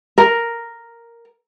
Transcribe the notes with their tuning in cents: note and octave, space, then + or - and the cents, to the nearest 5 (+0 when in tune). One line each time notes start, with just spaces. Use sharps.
A#4 +0